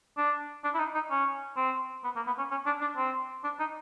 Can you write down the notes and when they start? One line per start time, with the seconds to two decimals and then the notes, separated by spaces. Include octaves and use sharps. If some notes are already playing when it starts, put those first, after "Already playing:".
0.17 D4
0.64 D4
0.74 E4
0.79 D#4
0.95 D#4
1.11 C#4
1.57 C4
2.04 B3
2.16 A#3
2.27 B3
2.38 C#4
2.51 C#4
2.66 D4
2.81 D4
2.97 C4
3.44 D4
3.60 D#4